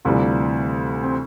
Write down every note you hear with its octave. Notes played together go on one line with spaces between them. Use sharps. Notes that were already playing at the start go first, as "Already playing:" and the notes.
D2 C3 E3 G3 F4
C4